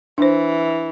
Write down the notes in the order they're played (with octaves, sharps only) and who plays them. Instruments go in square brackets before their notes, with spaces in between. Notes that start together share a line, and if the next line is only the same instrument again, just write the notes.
[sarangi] E3 [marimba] D4 C5